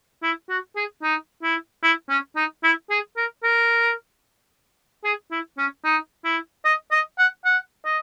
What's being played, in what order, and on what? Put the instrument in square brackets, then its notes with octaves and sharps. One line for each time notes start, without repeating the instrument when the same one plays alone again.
[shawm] E4
F#4
G#4
D#4
E4
E4
C#4
D#4
E4
G#4
A#4
A#4
G#4
E4
C#4
D#4
E4
D#5
D#5
F#5
F#5
D#5